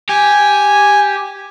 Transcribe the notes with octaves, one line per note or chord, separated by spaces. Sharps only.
G4 G#5